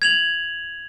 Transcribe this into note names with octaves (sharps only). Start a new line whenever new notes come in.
G#6 F7 F#7